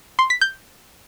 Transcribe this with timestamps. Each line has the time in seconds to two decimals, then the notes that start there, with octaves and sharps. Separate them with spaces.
0.19 C6
0.30 B6
0.41 G6